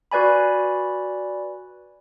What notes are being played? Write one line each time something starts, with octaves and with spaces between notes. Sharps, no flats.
F#4 B4 D5 G#5 B5